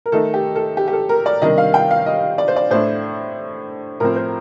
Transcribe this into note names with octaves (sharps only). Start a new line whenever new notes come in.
A#4
D#3 A3 D#4 A4
G4
A4
G4
G4
A4
A#4
D5
C3 D#3 G3 D4 D#5
F5
G5
F5
D#5
D5
C5
D5
A2 A3 D4 C5
A2 F3 C4 A#4
C5